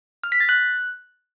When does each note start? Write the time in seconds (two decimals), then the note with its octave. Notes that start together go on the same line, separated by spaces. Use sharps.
0.24 F6
0.32 B6
0.40 A6
0.49 F#6